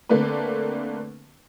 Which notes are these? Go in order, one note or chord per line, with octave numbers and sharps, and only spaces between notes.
D3 A3 A#3 C4 D4 B4